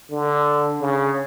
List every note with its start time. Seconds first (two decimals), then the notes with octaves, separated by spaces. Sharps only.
0.11 D3
0.80 C#3